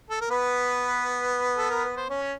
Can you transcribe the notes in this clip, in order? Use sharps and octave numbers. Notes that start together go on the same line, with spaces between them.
A4
A#4
B3 B4
A4
A#4
B4
C5
C#4 C#5